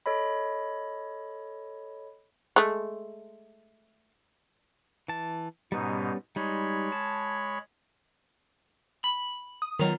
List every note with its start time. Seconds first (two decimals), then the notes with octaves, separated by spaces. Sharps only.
0.06 A4 C#5 D#5 B5
2.56 G#3 A3
5.08 E3 A5
5.72 G#2 B2 G3 B3 C#4 D#4
6.36 G3 G#3 D#4 C#5 B5
6.92 A5
9.04 B5
9.62 D#6
9.79 D#3 F#3 B3 F4 A#5